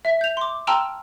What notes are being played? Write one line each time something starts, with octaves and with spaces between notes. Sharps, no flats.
E5 B6
G6 F7
C6 D6
G5 A5 A#5 C6 E6 F6